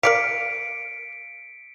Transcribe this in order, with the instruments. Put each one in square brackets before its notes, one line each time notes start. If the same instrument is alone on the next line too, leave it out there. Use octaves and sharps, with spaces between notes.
[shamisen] A#4 D5 F5 [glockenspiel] B6 C#7 D7